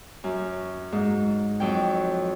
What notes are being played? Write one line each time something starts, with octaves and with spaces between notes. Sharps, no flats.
F#2
G#2
F2 F#3 G5